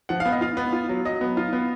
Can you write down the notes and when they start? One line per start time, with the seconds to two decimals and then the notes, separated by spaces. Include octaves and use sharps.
0.09 F3 F#5
0.20 F5
0.25 B3
0.32 D#5
0.41 F4 F5
0.57 B3
0.72 F4
0.89 F#3
1.05 F#3 D#5
1.21 B3
1.37 F4
1.53 B3